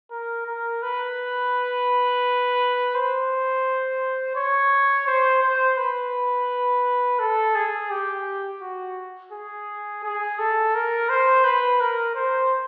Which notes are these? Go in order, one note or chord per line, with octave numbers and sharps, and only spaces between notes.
A#4
A#4
B4
C5
C#5
C5
C5
B4
A4
G#4
G4
F#4
G#4
G#4
A4
A#4
C5
B4
A#4
C5